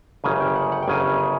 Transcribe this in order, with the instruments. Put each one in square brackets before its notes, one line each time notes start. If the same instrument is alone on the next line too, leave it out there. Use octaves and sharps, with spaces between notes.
[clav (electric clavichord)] G1 F#2 C#3 G#5
G5
F#5
F#5
G5
G1 F#2 C#3 G#5